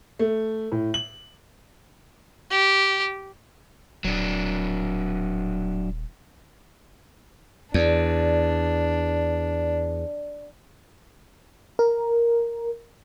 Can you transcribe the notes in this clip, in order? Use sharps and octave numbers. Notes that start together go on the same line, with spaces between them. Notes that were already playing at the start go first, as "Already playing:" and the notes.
A3
A2
F#7
G4
D#1 F#3 D4
E2 D4 D5
A#4